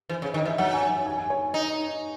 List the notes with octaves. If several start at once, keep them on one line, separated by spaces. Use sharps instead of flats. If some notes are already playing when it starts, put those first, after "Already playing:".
E3 C5
C#3 C#5
D#3 D#5
E3 E5
F#3 F#5
G#5
G#5
G#5
C#5
D#4